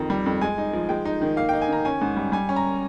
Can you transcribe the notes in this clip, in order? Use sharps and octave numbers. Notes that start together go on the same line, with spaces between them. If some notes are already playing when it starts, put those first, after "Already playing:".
Already playing: F2 D#3 A#5
G3
F2
G#3 G#5
D#4
F3
G#3 G5
D#4
D#3
A#3 F5
D#4 G5
G#5
D#3 A#5
C#4 G#5
G#2
G3
G3 G#5
C#4
A#5